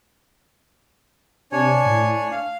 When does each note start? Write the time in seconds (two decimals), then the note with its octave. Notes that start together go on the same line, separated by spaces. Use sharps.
1.52 C3 D4 C#5 G#5
1.85 A2
2.32 F5